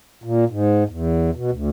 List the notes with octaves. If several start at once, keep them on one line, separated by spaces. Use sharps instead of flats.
A#2
G#2
E2
B2
D2